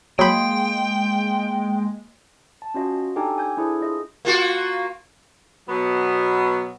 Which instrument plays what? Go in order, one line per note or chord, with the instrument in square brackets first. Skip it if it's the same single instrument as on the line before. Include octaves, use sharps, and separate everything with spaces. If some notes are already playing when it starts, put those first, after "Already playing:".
[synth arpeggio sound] F#3 B5 [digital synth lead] G#3 [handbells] A#3 C6 G6 [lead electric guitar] G5
[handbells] A5
C#4 F4 F#4 D#5
D4 D#4 G4 A4 G5 G#5
G#5 D6 G6 G#6
D4 E4 G#4 A4 C5
F4 G#4 D#5
[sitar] A#3 F4 F#4
[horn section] B2 F#3 B3